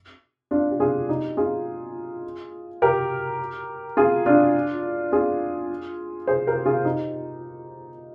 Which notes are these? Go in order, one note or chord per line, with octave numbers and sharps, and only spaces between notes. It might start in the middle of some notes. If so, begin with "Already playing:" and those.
D4 F4
G4
F4 G#4
D#4 G4
F4 G#4
G4 A#4
F4 G#4
D4 F4
F4 G#4
G#4 C5
G4 A#4
F4 G#4
D#4 G4